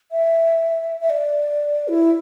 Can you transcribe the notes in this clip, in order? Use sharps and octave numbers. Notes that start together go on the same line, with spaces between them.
E5
E5
D5
E4